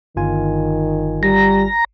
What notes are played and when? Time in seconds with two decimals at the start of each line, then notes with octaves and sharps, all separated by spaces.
0.16 G1 D#3 F4 G#5
1.23 G3 A#5